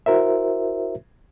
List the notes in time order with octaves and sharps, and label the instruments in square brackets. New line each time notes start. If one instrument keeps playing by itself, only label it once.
[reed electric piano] E4 F#4 A#4 C5 E5